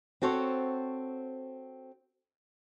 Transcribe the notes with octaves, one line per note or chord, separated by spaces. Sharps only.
C4 F#4 A4 C5 C#5